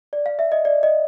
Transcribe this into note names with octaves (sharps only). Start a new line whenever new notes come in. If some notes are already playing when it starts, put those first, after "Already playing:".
D5
F5
E5
D#5
D5
D#5